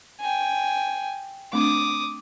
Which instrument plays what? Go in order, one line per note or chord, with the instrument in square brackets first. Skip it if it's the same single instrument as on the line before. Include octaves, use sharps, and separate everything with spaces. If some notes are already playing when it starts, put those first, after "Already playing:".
[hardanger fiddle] G5 G#5
[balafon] A3 C4 D4 [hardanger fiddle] D6 D#6